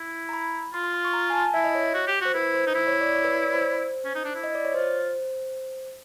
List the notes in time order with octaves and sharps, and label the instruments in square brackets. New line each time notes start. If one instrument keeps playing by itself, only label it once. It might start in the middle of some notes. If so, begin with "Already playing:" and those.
Already playing: [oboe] E4
[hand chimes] A#5
B5
[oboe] F4 [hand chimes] C6
[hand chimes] C6
C6
C#6
A#5
G#5
A5
[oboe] E4 [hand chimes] E5
[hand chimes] D#5
C#5
[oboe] F#4
G4
[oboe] F#4 [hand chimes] C5
[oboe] E4 [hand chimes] B4
[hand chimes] C5
[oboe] D#4
E4
[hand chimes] C#5
D5
C#5
B4
C#5
D5
C5
[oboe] C#4
D#4
D4
E4
[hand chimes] D#5
D5
C#5
[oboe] F4 [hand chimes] C5